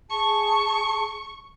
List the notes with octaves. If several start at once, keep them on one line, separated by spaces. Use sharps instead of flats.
G#4 A5 C#6